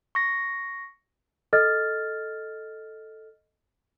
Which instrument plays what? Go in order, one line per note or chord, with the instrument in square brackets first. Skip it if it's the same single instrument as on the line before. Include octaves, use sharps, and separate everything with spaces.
[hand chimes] C#6 A#6
[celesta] A4 D#5 F6 A6